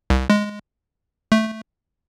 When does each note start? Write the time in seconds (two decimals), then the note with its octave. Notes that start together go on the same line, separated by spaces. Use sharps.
0.10 C2
0.30 G#3
1.32 A3